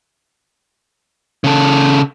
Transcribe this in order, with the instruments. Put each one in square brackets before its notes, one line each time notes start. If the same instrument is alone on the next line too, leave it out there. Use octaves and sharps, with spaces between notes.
[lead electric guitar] C#3 A4